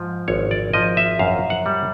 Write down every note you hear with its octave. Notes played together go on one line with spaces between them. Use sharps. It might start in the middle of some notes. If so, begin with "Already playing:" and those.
Already playing: G#2 F3
G#1 C#5
D5
F3 D#5
E5
F#2 F5
F#5
G3